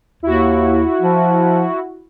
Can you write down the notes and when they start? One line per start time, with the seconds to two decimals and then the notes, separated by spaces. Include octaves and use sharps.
0.23 D#2 E4 F#4
1.01 F3